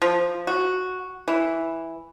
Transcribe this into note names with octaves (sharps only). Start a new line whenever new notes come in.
F3
F#4
E3